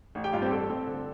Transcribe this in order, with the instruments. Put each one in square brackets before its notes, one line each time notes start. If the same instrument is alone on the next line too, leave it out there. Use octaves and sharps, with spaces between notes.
[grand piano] A1
G4 G5
G2 F4 F5
C4 G4 C5
A1 A4
C4
D3